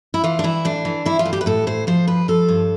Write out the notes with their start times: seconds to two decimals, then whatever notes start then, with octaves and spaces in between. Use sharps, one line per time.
0.14 E4
0.24 E3 F4
0.39 D4
0.44 E3 E4
0.65 A2 D4
0.85 E3
1.05 E3 E4
1.19 F4
1.26 A2
1.33 G4
1.41 B4
1.46 A2 A4
1.67 A2 C5
1.87 F3 C5
2.08 G2 B4
2.28 F3 A4
2.48 G2